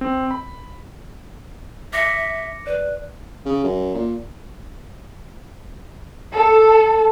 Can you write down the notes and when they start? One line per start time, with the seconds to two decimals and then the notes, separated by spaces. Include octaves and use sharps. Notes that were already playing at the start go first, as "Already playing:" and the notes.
0.01 C4
0.31 B5
1.93 E5 D6 A#6 C#7
2.67 B4 D5
3.45 C#3
3.64 F#2
3.95 A#2
6.35 A4